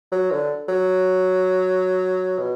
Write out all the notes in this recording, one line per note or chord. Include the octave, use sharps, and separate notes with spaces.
F#3
D3
F#3
B2